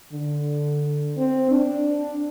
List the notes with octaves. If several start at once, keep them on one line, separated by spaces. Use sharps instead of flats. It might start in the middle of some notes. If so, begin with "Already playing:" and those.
D3
C4
D4